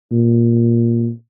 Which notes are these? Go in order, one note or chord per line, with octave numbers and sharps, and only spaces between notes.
A#2